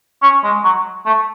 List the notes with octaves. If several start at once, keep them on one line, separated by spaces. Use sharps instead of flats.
C#4
G#3
F#3
A3